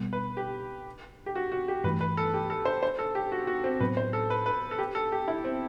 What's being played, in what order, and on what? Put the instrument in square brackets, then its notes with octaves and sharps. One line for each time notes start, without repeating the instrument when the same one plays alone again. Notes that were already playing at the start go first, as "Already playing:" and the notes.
Already playing: [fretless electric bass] B2 G3 B3
[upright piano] B4
G4
G4
F#4
F#4
G4
[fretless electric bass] G2 E3 A3 [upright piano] B4
[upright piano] B4
A4
G4
A4
C5
C5
A4
G4
F#4
F#4
C4
[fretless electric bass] A2 F#3 B3 [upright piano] B4
[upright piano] C5
A4
B4
B4
A4
G4
A4
G4
E4
C4